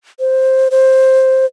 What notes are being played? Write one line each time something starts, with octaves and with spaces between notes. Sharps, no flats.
C5
C5